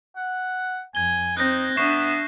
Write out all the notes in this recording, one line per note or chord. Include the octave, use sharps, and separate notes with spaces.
F#5
F2 G#5 G#6 G7
C4 D#4 F#6 G6 A#6
B3 D4 E5 C#6 C7 E7